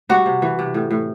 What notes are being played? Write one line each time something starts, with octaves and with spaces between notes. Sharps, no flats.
G3 F#4
C3
E3
C3
A2
A2